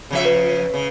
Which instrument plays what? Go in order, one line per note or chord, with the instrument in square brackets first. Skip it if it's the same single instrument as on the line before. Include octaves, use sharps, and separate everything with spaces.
[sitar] C#3 F3 E5
[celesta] B4
[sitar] C#3